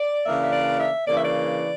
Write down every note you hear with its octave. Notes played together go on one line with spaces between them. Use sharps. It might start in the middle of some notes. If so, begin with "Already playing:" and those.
Already playing: D5
C#3 E3 A#3 D4 E5
E5
D5
E5
C#3 E3 A#3 D4 D5
E5
D5